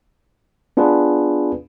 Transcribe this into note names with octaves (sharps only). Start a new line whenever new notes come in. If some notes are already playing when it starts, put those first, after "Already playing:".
B3 D4 F4 G#4 B4